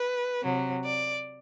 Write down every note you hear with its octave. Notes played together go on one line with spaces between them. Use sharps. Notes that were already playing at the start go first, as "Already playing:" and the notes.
Already playing: B4
C3 F#3
D5